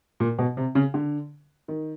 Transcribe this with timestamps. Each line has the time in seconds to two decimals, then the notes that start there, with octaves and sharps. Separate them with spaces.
0.20 A#2
0.39 B2
0.57 C3
0.75 C#3
0.94 D3
1.68 D#3